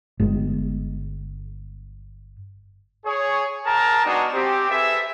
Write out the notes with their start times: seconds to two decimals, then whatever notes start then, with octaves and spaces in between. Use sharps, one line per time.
0.20 G1 G#3
3.06 G#4 C#5
3.66 G#4 A#4 G5 A5 A#5
4.05 G#3 B3 D4 D#4 F#4 G#4
4.34 C4 G4
4.70 G#4 A4 B4 E5